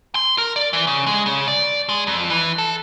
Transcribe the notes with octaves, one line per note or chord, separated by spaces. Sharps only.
C6
A#4
D5
E3
C#3
G#3
C#3
D5
G#3
F2
E3
A4